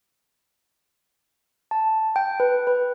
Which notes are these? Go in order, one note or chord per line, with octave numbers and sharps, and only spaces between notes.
A5
G5
B4
B4